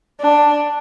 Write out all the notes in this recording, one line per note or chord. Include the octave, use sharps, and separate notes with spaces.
D4